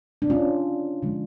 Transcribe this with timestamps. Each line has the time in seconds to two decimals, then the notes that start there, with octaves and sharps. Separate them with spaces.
0.22 D4
0.30 C#4 F4
1.03 D3 F3 G#3